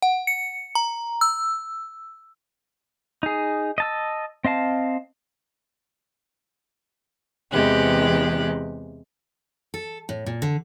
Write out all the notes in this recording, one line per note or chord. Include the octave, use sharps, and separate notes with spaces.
F#5
C#7
A#5
E6
D#4 G#4
D#5 A5 E6
C4 D#5 F5 A5
E2 C3 E3 G#3 G4 F#6
A4
A2
A#2
D3